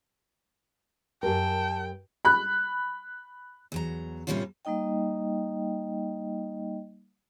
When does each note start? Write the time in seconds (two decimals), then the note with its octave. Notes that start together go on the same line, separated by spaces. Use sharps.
1.23 F#2 G4 A#4 G5 A5
2.25 B5 F#6
3.72 E2 F#3 A#5
4.27 A2 C3 G3 A#3 C#4 F4
4.65 G3 A#3 D#4 D#5 G5